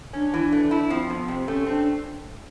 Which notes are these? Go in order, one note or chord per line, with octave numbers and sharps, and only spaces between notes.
C#4 D4
E3
A3
E4
F3 C4
F2 B3
C3 C4
A3 C#4
C4 D4